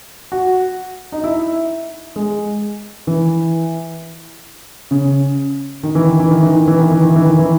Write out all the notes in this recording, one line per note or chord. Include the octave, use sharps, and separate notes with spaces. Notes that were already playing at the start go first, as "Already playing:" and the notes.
F#4
D#4
E4
G#3
E3
C#3
D#3
E3
D#3
E3
D#3
E3
D#3
E3
D#3
E3
D#3
E3
D#3
E3